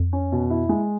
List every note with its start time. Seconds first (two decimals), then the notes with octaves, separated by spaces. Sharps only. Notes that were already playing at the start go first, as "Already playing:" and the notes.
Already playing: F2
0.13 C#4
0.32 B2
0.50 E4
0.69 G#3